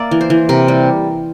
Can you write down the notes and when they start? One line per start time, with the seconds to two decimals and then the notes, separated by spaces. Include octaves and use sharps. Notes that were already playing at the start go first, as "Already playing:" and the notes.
Already playing: A#3 D5 E5
0.11 E3
0.21 C5
0.30 E3
0.49 C3 A#4
0.68 G3